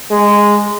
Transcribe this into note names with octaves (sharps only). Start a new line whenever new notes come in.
G#3